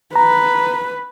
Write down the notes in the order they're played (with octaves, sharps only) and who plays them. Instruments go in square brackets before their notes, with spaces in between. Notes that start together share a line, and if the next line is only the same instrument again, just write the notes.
[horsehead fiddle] B4 [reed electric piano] A#5